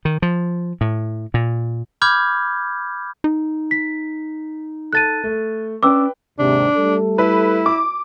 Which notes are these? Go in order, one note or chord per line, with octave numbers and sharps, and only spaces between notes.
D#3
F3
A2
A#2
B5 D6 F6 G6 G#6
D#4
B6
A4 A5 F#6 A6 D#7
A3
B3 C#4 D4 B4 G5 D6 E6
D#2 G#2 C3 D4
G3 A3 A4
E4 B4
D6